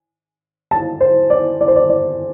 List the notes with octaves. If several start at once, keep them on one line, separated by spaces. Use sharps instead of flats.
A5
C5
D5
D5
C5
D5
D5